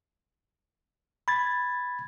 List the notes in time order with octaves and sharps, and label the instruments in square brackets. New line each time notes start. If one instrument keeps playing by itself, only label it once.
[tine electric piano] B5 G#6 A6